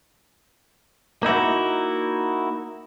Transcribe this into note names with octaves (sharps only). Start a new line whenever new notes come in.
A#3 D#4 E4 F#4